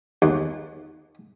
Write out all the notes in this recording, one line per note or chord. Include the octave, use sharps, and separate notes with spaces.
D#2